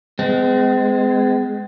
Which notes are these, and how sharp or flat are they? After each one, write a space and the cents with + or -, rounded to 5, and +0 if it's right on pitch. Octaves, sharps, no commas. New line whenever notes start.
G#3 +0 C4 -45